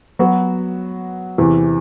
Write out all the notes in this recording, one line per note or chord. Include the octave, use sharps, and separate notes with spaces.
F#3 B3 F#4
E2 C3 E3